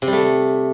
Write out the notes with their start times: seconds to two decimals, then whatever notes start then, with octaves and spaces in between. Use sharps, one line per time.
0.02 C3
0.07 G3
0.13 A3